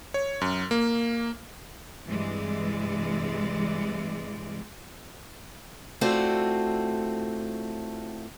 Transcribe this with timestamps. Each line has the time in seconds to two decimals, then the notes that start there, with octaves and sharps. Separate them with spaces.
0.14 C#5
0.41 F#2
0.71 A#3
2.07 G2 C3 E3 G3 G#3 D5
6.01 A2 A3 C4 F4 F#4 D5